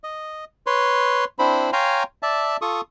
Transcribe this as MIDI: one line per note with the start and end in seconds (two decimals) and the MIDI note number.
0.04 0.45 75
0.67 1.25 71
0.67 1.25 73
0.67 1.25 84
1.39 1.71 60
1.39 1.71 62
1.39 1.71 64
1.39 1.71 72
1.39 1.71 83
1.73 2.03 73
1.73 2.03 77
1.73 2.03 79
1.73 2.03 80
1.73 2.03 82
1.73 2.03 84
2.23 2.57 74
2.23 2.57 76
2.23 2.57 81
2.62 2.81 65
2.62 2.81 69
2.62 2.81 85
2.62 2.81 87